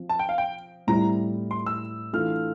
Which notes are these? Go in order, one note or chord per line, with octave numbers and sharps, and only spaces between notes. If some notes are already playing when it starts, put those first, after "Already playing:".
Already playing: F3 C4
A5
G5
F5
G5
A2 G3 C4 E4 G4 A#5
C6
E6
E3 A3 D4 F4 F6